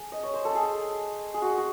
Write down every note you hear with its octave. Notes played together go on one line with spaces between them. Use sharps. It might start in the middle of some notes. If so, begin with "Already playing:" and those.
Already playing: A3 G#4
D#5
C#5
C5
A4
G#4
G#4
F#4
F#4